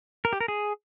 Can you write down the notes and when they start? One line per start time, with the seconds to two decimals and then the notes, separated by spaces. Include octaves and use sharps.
0.25 A#4
0.33 G4
0.40 A#4
0.48 G#4